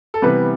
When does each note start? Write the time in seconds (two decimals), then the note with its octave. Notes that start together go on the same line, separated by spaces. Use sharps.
0.14 A4
0.22 C3 E3 G3 B3 B4